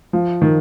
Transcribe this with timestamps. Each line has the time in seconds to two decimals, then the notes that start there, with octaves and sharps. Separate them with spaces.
0.13 F3
0.42 D#3